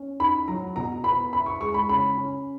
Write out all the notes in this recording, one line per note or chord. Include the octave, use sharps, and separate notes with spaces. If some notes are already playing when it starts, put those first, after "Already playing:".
Already playing: C#4
D#4 B5
F#3 A#5
B2 A#5
B3 B5
E4 B5
C#6
G#3 C#6
B5
C#3 B5
C#4